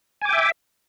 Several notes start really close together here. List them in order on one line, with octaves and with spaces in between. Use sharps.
G#5 D6 G5 E5